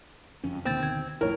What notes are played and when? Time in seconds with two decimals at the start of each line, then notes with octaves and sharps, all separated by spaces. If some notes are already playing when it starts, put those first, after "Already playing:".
0.44 F#1 F2 C#4
0.65 D2 B2 D#3 A#3 C4 A6
0.83 G#6
1.21 A#1 F2 A2 E4 A#4 C#5